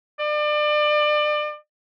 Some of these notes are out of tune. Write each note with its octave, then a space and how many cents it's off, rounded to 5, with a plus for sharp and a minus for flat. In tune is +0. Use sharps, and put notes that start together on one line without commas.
D5 +30